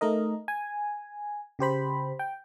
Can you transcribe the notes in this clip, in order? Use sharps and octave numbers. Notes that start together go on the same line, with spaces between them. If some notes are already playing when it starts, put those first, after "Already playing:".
A3 D#4 A#4 D#5
G#5
C#3 G4 C5 B5
G5